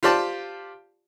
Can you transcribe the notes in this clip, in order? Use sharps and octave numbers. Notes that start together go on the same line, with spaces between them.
F4 G4 C5 D5 A5